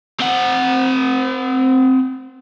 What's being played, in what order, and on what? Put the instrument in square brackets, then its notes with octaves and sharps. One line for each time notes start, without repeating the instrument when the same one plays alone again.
[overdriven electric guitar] C4 F#5